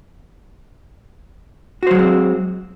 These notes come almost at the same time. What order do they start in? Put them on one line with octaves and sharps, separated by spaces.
F#4 C5 F#3 G#3 C4